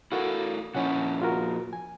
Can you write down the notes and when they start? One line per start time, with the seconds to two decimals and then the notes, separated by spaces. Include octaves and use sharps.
0.12 E4 F#4 A4 A#4 F5
0.75 A#2 F3 C#4 E4 F#5
1.22 F4 F#4 A#4
1.73 G#5